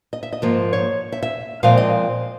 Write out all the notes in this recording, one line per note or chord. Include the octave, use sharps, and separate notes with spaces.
D#5
E5
D#5
G#2 F3 A#3
C#5
E5
E5
A#2 F3 G#3 C4 F5
D#5